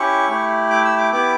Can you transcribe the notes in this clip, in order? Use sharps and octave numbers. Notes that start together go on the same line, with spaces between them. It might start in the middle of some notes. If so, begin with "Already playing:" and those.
Already playing: C#4 E4 G4 C#6
A3 E4 G4
D6
E6
D6
B3 E4 G4 D6